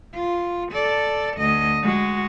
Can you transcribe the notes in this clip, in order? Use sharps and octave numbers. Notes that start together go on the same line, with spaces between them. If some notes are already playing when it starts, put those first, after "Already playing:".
F4
A4 D5
D2 D#5
G#3 F#4